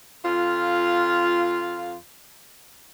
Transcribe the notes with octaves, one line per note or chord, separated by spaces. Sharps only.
F2 F4